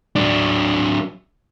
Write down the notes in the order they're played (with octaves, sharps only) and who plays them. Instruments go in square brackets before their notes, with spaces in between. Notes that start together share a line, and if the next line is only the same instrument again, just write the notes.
[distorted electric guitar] F#3 D4